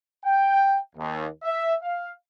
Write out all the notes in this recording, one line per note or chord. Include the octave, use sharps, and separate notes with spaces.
G5
D#2
E5
F5